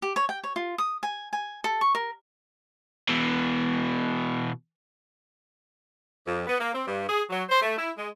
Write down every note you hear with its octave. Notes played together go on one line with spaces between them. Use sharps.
G4
C#5
G5
C#5
F4
D#6
G#5
G#5
A4
C#6
A#4
B2 E3
F2
B3
A#3
C4
G2
G#4
F#3
C5
A3
E4
G#3